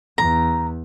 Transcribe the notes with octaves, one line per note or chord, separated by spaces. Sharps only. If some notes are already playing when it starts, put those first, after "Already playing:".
E2 A#5